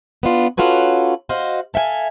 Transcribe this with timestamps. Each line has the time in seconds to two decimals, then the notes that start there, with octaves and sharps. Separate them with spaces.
0.23 B3 D4 F4
0.57 C#4 F4 F#4 A4 B4 C#5
1.29 F#4 C5 D#5 F5
1.74 A4 E5 F5 G5 G#5